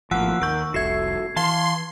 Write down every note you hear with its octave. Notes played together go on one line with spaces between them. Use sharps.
G#1 A2 F3 A#3 F#5 E6 F#6
D#2 A#4 C#6 E6 G6
F1 C2 F#4 A4 E5 G#6 C7
E3 F5 A5 C6